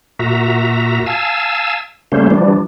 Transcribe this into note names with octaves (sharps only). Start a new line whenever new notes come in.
A#2 F#4 E5 A#5
F5 G#5 A5 E6
C#3 G3 A3 A#3 C#4 C5
E3 F3 G3 D4